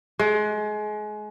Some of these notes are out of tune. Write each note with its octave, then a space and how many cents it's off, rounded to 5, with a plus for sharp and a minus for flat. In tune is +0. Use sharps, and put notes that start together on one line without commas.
G#3 +30